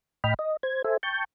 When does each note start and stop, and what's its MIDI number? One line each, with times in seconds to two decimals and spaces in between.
0.24 0.34 45
0.24 0.34 75
0.24 0.34 79
0.24 0.34 83
0.24 0.34 89
0.39 0.57 75
0.63 0.82 72
0.63 0.82 92
0.84 0.97 69
0.84 0.97 72
0.84 0.97 76
0.84 0.97 80
1.03 1.24 79
1.03 1.24 81
1.03 1.24 85
1.03 1.24 91